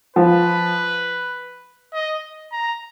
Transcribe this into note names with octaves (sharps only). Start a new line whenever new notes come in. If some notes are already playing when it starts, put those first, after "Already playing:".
F3 B4
D#5
A#5